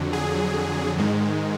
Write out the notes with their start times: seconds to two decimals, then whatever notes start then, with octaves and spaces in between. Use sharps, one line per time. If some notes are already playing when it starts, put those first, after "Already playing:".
Already playing: F2 D3 F#3
0.13 G#4
0.98 G#2 D#3 G#3